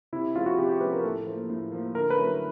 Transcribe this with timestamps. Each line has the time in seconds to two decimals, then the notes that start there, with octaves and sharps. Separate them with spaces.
0.13 C3 E4
0.35 F3 G#3 C#4 F4
0.46 F#4
0.58 C3 G4
0.69 G4
0.81 F3 G#3 C#4 B4
0.92 A#4
1.03 A2 A4
1.26 F3 A#3
1.49 A2
1.71 F3 A#3
1.95 D3 A#4
2.10 B4
2.17 F#3 A3 C#4 E4